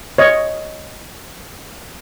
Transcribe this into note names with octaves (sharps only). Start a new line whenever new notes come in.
C#5 D#5